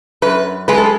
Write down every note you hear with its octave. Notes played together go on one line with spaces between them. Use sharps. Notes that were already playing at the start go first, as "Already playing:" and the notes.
F#2 B4
G#3 B4
A4